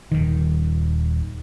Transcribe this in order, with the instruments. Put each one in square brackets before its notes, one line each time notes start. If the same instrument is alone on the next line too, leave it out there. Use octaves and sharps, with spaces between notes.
[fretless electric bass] D#1 B1 D#3